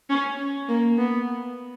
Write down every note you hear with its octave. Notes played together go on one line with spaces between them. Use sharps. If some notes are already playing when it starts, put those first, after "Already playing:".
C#4
A#3
B3